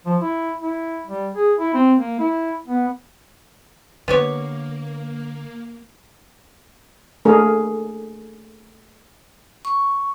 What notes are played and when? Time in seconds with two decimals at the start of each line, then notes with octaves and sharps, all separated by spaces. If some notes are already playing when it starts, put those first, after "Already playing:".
0.06 F3
0.22 E4
0.61 E4
1.07 G3
1.35 G#4
1.58 E4
1.74 C4
1.98 A#3
2.20 E4
2.68 B3
4.08 D3 A#3 B3 G4 C#5
7.25 A3 A#3 D4 G#4 A#4
9.65 C#6